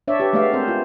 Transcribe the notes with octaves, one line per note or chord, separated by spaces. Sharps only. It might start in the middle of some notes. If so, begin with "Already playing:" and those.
D4 C#5 D5 E5
G4 B4
G#3 A3 B3 D5 E5 F5
C4 A#4 C5
F4